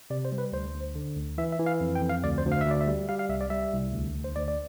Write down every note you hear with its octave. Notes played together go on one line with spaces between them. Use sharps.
C3 D5
C5
G3
B4
D2 C5
D2
D3
D2
E3 E5
E5
E3
F5
F2
G5
F2
F5
D2 D5
C5
D2
F5
E5
D2 D5
E5
G3
G3 F5
F5
C2 E5
D5
G3 E5
C2
D2
D2
C5
D2 D5
D5